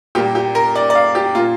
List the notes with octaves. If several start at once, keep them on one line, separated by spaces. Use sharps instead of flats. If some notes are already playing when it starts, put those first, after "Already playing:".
A#2 G3 A#3 G4
G4
A#4
D5
D5
F5
G4
A#2 A#3 F4